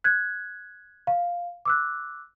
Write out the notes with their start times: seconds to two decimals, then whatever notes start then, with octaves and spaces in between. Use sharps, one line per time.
0.04 F#6 G#6
1.07 F5
1.65 D6 E6 F#6